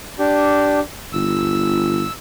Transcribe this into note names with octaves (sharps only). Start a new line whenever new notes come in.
D4 G4
G1 E6